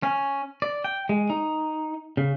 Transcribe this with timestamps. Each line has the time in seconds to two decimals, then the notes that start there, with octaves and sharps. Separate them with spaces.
0.03 C#4
0.62 D5
0.84 G5
1.09 G#3
1.30 D#4
2.17 C#3